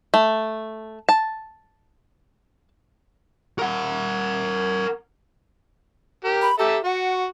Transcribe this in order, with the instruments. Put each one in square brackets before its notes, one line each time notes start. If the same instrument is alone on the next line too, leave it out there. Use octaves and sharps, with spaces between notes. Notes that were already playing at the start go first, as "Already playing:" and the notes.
[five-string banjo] A3
A5
[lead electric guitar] A#4 F#5
[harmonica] G4 A#4
[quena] B5
[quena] G4 [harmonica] A4 E5 A#5
[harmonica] F#4 [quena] F#5